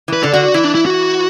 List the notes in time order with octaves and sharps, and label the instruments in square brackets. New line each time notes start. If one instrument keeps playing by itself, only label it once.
[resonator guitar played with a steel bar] E3 [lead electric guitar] B4
[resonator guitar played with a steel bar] D3 [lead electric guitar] A4
[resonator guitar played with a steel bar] D3 [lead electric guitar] F#4
[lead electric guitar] F#4
[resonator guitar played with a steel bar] E3 [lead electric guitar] E4
[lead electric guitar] D4
E4
F#4